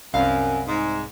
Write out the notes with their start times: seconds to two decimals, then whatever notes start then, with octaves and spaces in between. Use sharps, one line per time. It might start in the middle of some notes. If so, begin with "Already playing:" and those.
0.14 C2 F#2 F5
0.67 G#2